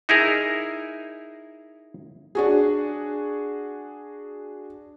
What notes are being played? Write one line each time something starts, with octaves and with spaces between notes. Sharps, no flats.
D#4 E4 G#4 A#4
D4 F#4 G#4